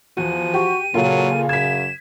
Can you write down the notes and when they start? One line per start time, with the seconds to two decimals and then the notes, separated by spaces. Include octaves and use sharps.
0.17 E2 F3 F#4 D#7
0.54 F#4 G4
0.94 A#2 C#3 F#3 F4 A4
1.49 F#2 G#6 B6 E7